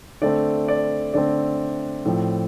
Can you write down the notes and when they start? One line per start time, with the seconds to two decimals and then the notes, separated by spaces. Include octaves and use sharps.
0.22 D3 A3 C4 D5
0.68 D5
1.14 D3 A3 C4 D5
2.05 A2 F3 C4